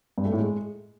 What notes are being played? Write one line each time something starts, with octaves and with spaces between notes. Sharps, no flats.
G2
A3
A2
G#3